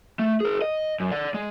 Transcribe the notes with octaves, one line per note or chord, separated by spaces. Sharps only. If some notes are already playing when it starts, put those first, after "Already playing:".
A3
G#4 A#4
D#5
F#2
D5 F#5
G#3